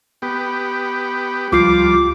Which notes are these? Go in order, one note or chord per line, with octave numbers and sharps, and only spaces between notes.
B3 G4
C#2 F3 G3 F4 D6 C7